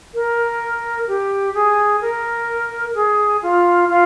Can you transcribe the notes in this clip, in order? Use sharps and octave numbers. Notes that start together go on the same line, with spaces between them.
A#4
G4
G#4
A#4
G#4
F4
F4